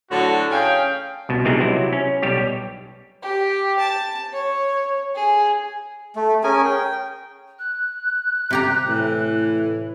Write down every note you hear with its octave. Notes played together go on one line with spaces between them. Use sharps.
A2 D3 F#3 F#4
C#4 G#4 F5 G5
C2 B2
E3 G3 G#3 C4 D4 D#4
C3 F#3 E4
C#4
B1 G3 G4 C#5
G4
A5
C#5
G#4
A3
C#4 G#4 A#4 G#5
G5
F#6
C3 G4 A#5
A2 E3